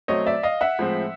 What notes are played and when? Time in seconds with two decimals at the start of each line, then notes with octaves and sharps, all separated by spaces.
0.08 B2 F#3 A3 C4 C#5 D#5
0.26 D5 E5
0.43 D#5 F5
0.61 E5 F#5
0.79 A2 F3 G#3 C4